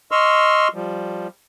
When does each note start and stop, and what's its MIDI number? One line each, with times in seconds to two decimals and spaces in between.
0.11 0.68 75
0.11 0.68 84
0.11 0.68 85
0.11 0.68 88
0.11 0.68 89
0.74 1.27 53
0.74 1.27 55